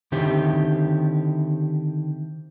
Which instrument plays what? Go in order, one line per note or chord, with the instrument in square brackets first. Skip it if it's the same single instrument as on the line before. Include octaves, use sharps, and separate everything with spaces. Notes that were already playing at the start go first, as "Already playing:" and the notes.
[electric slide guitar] D3 D#3 C4 E4 G4